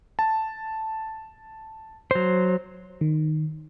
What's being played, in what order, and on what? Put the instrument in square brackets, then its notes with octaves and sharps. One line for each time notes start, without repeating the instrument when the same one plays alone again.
[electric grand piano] A5
[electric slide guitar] F#3 C5
[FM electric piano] D#3